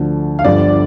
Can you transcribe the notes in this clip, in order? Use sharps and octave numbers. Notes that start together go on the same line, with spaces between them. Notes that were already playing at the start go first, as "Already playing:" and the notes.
Already playing: D2 D3 F3
F5
G1 G2 D3 F3 D5